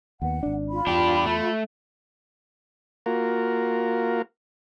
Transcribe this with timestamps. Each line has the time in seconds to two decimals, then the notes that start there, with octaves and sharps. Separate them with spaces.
0.22 D#2 B3 F#5
0.43 G#1 D4
0.71 F4 B5
0.87 E2 D4 G4
1.26 A3
3.06 A#3 F4 F#4 A#4